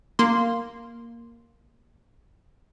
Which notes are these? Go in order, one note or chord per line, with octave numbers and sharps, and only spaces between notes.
A#3 C6